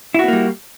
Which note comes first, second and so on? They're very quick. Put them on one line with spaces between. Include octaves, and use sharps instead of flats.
E4 F#4 B3 A#3 G3